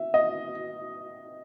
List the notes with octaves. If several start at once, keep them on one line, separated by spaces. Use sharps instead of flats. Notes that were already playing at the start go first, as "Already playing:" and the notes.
Already playing: E5
D#5